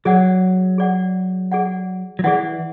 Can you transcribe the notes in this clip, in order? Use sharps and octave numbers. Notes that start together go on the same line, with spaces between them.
F#3 G#4 D5 F#5
G#4 D5 F#5
G#4 D5 F#5
F#3
E3 G#4 D5 F#5